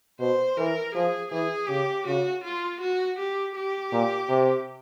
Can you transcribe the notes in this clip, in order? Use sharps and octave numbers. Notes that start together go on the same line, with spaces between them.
B2 C5
E3 A#4
F3 G#4
E3 G#4
C#3 G4
C#3 F#4
F4
F#4
G4
G4
A#2
C3